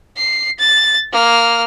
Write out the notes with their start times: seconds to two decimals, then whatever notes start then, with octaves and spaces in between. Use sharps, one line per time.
0.17 C7
0.59 A6
1.12 A#3 F6